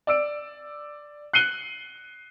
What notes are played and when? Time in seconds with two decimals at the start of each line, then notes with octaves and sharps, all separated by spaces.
0.07 D5 E6 D7
1.33 F#6 C7 C#7 D#7 G7